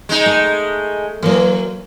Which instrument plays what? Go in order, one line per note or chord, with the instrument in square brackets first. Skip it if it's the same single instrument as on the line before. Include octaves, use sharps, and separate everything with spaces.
[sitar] G#3 D#4
[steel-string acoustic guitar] A3
[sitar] E3 [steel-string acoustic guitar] F#3 A#3